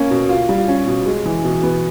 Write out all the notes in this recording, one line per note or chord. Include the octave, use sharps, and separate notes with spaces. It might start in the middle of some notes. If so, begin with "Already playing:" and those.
Already playing: A#3 C#4
B2
F4
G3
C#4
B2
G#3
E3
B2
B3